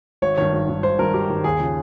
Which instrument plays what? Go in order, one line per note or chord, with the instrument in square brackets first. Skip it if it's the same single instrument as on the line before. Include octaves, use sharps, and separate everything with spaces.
[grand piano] G#1 C#5
G2 D#3 C#5
G#1
G2 D#3
G#1 C5
G2 D#3 A#4
G#1 G4
G2 D#3
D#2 G#4
C#3 F3